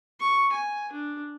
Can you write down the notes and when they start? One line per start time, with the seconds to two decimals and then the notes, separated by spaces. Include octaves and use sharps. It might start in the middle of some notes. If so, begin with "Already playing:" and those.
0.20 C#6
0.53 G#5
0.92 D4